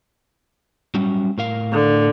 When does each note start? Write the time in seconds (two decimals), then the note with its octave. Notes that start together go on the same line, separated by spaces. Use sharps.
0.95 F#3 G3 C#4
1.38 A2 A#4 F5
1.73 D3